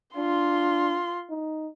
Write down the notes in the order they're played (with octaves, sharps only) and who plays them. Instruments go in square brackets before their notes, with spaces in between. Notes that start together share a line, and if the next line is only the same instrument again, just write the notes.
[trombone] D4 [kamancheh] F4 C6
[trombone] D#4